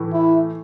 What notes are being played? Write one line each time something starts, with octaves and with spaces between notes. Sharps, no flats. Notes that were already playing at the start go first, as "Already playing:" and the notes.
Already playing: A2 E3 A3
E4